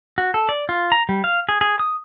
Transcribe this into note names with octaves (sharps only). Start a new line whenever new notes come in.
F#4
A4
D5
F4
A#5
G3
F5
G#4
G#4
D#6